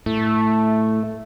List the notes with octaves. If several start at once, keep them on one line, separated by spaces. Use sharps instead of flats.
A2 A3